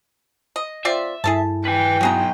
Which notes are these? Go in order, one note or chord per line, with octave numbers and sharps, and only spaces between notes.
D#5
C4 F4 D5 E5
G2 E4 G#4 A4 A5
B4 G5 G#5
F#3 B3 F#4 G#4 A#5